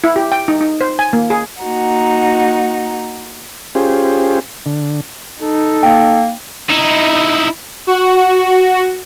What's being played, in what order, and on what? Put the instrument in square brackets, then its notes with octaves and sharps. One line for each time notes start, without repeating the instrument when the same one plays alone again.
[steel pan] E4
G4
G5
D#4
D#4
C5
G#5
A#3
G#4
[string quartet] A#3 D#4 F#4 F#5 A#5
[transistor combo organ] C#4 F4 G4 G#4 C5
D3
[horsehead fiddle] D#4 [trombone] A4
[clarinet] A#3 [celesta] G5
[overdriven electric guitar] D#4 E4
[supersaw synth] F#4